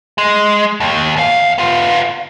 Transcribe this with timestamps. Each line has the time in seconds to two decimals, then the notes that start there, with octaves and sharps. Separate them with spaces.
0.18 G#3
0.80 D#2
1.16 E2 F5
1.58 B3 F4